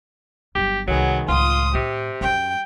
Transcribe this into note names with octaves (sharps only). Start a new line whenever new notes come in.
G1 F#3 G4
C2 D#3 F#3 B3 G#4
C#2 A2 F4 C6 D#6
A2 C3 G4
F#2 D#3 G5